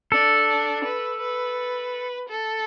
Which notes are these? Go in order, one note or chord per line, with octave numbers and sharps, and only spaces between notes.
D4 A4
B4
B4
A4